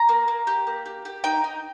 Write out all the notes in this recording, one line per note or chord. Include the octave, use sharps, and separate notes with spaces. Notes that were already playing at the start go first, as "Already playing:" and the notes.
Already playing: A#5
A#3
A#3
G4
A#3
G4
G4
D#4 G5
D#4